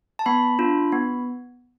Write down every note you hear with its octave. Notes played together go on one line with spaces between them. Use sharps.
A5
B3 B5
D4 F4
B3